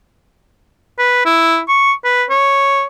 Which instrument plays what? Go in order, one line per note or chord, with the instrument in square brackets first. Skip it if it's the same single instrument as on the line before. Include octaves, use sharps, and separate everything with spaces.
[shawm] B4
E4
C#6
B4
C#5